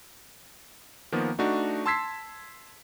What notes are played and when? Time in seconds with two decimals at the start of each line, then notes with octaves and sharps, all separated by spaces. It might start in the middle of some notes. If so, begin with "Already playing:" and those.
1.12 D#3 F3 A#3 B3
1.39 A3 D4 D#4 F#4
1.86 A5 C6 E6 G#6 B6 C7